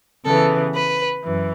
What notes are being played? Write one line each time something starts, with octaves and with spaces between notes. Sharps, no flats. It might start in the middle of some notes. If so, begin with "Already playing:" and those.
C#3 E3 B3 A4
B4
F#2 E3